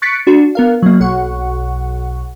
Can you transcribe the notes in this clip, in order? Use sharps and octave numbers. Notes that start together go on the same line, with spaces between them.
C#6 F#6 A6 B6 C#7 D7
D4 F#4
B3 A#4 F5
F#3 A#3
B1 F#5 C#6